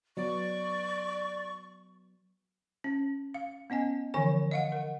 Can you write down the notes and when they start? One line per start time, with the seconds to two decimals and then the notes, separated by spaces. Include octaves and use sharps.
0.17 F#3 B3 D5 C#6
2.84 C#4
3.34 F5
3.70 B3 C#4 D#5 G#5
4.14 D3 E3 F3 G#5 C#6
4.51 D#5 F5 F#5
4.72 A#4 F#5